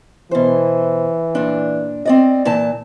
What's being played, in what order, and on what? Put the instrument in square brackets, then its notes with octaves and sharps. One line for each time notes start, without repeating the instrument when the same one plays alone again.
[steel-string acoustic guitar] B2 C5 [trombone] E3
[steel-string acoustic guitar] A#2 D4
C4 D5 D#5
A#2 E3 A5